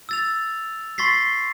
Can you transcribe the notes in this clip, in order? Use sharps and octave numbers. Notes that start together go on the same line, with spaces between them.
E6 A6 F7
C6 C#6 A6 B6 C7